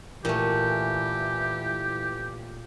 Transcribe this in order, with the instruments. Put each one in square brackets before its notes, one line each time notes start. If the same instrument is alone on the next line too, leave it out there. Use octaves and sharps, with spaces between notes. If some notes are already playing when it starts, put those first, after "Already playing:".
[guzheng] A#2 A3 [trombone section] E3 [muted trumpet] G4